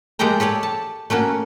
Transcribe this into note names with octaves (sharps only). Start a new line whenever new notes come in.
G#3 A#3 G4 A4 G5 A#5
G4 A4 C#5 D5
A5
A3 A#3 C#4 F#4